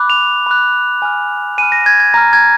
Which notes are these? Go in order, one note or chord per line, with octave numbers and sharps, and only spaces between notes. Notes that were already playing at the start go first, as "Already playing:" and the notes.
Already playing: B5 D6 F#6
F7
B5 D6 F#6
G#5 B5 F6
G#5 B5 F6 D#7
A#6
G#6
G#6
A#5 F6 A#6
G#6